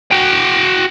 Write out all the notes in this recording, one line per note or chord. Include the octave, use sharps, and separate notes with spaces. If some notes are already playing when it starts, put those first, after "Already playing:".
F#4 G5